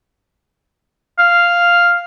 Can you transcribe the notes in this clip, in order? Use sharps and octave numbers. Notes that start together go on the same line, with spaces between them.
F5